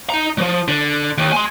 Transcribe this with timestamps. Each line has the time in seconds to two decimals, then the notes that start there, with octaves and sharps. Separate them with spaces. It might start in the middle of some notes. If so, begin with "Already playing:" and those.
0.10 D#4 A#5
0.38 F3 F#3
0.68 D3
1.18 D#2
1.32 G#5 C6